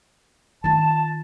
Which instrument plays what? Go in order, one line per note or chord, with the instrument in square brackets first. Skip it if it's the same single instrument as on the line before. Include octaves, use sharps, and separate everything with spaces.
[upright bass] D#3 F4 [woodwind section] A5